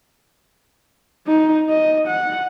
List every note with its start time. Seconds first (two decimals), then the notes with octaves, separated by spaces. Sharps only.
1.27 D#4
1.69 D#5
2.07 F#5